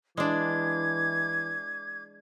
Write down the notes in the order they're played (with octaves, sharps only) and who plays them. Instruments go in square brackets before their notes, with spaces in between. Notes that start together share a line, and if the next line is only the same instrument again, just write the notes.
[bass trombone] E3 [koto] G#3 D4 [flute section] D6 G#6